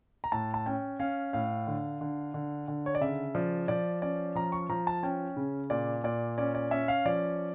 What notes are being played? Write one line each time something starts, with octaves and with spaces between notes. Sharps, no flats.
A#5
A2 A5
A5
C#4 G5
C#4 F5
A2 F5
D3
D3
D3
D3
C#5
D5
C#3 E5
F3 D5
F3 D5
C#4 D5
F3 A#5
C#6
F3 A#5
A5
C#4 G5
C#3
A#2 D5
A#2 D5
C#4 D5
D5
C#4 E5
F5
F3 D5